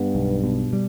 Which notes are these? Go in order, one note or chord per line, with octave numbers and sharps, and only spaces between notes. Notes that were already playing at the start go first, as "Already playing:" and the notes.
Already playing: G2 B3
B1
B2
G3